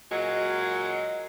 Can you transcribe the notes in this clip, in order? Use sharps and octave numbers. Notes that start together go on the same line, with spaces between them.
A#2 F#3 G#3